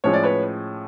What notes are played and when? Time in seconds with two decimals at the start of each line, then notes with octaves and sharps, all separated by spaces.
0.04 A2 F3 G#3 C#4 C#5
0.14 D5
0.24 B4 C#5